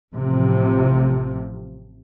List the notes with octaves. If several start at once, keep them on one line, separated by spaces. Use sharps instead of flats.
A1 A2 C3 F3